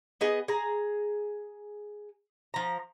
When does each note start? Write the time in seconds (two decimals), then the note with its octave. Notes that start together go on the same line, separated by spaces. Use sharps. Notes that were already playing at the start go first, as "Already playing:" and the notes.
0.21 B3 G#4 D#5
0.48 G#4 A#5
2.54 F3 A#5